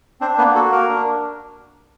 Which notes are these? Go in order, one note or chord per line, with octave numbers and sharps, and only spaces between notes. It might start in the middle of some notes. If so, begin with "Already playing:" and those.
C4 D4 C5
A#3 B3 B4
F#4 A4
A#3 A#4
D4